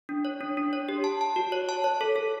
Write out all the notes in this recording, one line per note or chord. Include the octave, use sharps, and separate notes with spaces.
D4
C#5
D4
D4
C#5
G4
A5
A5
F#4
C#5
A5
C#5
A4
A4